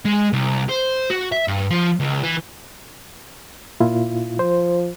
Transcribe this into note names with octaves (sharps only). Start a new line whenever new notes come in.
G#3
C2
C5
F#4
E5
G2
F3
C#2
E3
A#2 E4 F4
F3 C5